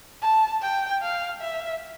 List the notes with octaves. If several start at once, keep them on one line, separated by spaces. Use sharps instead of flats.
A5
G5
F5
E5